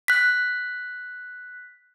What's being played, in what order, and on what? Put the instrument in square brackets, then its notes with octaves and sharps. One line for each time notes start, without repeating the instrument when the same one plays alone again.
[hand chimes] F#6 B6